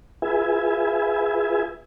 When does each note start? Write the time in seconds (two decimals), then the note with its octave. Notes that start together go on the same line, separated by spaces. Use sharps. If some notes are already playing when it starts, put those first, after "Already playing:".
0.22 F4 G#4 B4 E5 G#5